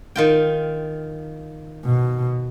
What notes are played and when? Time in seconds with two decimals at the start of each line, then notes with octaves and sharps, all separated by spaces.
0.16 D#3 F4 G5
1.85 B2